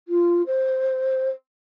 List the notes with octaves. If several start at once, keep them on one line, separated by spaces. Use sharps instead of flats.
F4
C5